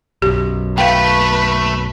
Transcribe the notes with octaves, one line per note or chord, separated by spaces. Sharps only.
B1 F#2 G4
A3 B4 F5 G5